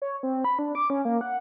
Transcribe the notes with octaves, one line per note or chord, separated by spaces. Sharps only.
C#5
C4
B5
D4
D6
C#4
A#3
F#5